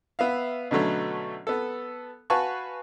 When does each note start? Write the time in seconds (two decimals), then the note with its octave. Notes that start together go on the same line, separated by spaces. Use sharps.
0.19 B3 E5 F5
0.71 B2 D3 F#3 A3 C#4
1.47 B3 A4
2.30 F#4 B4 F5 G#5 A5 C#6